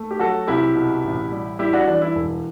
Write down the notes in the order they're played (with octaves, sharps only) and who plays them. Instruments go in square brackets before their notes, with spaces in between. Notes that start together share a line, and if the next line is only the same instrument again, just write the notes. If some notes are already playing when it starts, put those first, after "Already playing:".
Already playing: [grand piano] A3
G4
F#3 F#4 A4
C2 E4 G4
B2
A1
G3
G3 E4 G4
D4 F#4
E3 D4
E4
E1